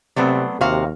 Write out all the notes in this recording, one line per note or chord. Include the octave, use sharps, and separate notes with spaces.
C3 F#3 A3 B3 C4 A4 D5
D#2 C3 F#4 F5